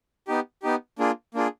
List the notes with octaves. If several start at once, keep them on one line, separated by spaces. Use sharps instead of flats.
B3 D#4 G4
B3 D#4 G4
A#3 D4 F4 G#4
A#3 D4 F4 G#4